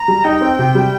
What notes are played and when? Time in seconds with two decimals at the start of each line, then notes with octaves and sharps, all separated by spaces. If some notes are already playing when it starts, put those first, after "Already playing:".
Already playing: A#5
0.08 G3
0.24 D#4 G5
0.41 C4
0.59 C3
0.75 G3